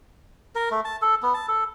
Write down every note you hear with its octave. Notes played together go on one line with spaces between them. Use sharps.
A#4
A3
A5
A4
B3
A5
A4